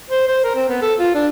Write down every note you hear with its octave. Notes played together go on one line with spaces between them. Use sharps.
C5
C5
A#4
C4
B3
A4
F4
D4